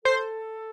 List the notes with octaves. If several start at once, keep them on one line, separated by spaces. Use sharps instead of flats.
A4 C5